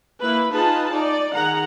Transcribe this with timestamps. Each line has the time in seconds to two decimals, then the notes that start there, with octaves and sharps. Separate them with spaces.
0.21 A#3 E4 B4
0.51 D#4 F4 G#4 B4 A5
0.92 D#4 D5
1.34 D#3 G#4 F#5 A#5